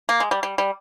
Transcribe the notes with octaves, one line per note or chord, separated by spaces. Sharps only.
A#3
G#3
G3
G3
G3